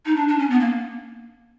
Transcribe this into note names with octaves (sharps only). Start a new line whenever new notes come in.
D#4
D4
D4
C#4
B3
A#3